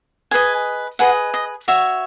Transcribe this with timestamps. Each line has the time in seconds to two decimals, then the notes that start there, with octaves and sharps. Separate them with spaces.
0.31 G#4 B4 D#5 G#5
0.99 G#4 B4 D#5 F#5
1.34 D#5
1.68 F#4 C#5 E5